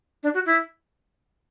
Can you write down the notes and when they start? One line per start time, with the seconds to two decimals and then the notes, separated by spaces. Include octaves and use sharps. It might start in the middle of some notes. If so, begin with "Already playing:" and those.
0.23 D4
0.34 F#4
0.46 E4